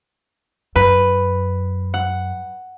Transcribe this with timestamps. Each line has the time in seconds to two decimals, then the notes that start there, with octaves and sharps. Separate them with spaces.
0.76 F#2 B4
1.94 F#5